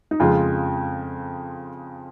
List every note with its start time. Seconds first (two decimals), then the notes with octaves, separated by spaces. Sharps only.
0.11 D#4
0.20 F2 C#3 G#3 F4